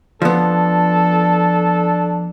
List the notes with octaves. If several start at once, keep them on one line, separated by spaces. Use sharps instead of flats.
F3 B3 D4 A4